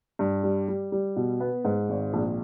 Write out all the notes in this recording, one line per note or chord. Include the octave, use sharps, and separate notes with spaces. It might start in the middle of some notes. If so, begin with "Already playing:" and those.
G2
G3
G3
G3
B2
B3
G#2
G#1
A#1